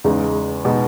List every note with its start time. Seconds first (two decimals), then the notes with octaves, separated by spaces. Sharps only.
0.04 E2 C#3 G#3 D#4
0.65 B2 G#3 D#4